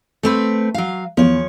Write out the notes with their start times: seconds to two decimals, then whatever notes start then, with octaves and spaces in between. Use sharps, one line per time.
0.23 A3 C4 B4
0.74 F#3 F5
1.17 E2 F3 C#5